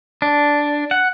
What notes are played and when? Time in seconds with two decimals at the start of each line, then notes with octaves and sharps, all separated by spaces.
0.22 D4
0.91 F#5